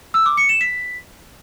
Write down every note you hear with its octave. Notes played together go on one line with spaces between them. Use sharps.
E6
D6
C#7
E7
B6